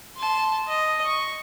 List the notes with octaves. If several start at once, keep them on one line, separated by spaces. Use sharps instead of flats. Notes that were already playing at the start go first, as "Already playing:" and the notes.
A5 C6
D#5
C#6